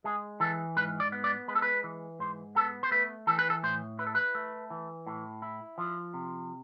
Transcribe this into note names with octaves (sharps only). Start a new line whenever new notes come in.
G#3 G#4
E3 A4
G#2 B4
D5
B3
D5
G#3 B4
A4
B4
E3
G#2 C5
B3 A4
C5
A3 B4
E3 A4
B4
A4
A2 C5
E4 B4
A4
B4
A3
E3
A2
E4
F3
C3